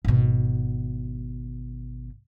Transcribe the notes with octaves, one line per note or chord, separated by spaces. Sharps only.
G#1 B2